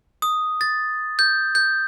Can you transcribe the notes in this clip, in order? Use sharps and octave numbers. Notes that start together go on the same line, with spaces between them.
D#6
A6
G6
G6